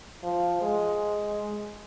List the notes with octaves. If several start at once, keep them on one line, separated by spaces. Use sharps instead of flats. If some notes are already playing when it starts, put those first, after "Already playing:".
F3
G#3